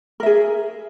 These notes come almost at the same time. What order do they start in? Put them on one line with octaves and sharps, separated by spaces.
A#4 E5 G#4